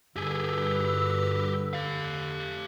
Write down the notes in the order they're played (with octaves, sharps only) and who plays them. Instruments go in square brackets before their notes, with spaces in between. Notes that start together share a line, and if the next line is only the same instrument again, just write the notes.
[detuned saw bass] G2 [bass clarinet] D3 [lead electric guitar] G4 G#4 [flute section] B4 E6
[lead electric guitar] G4 F5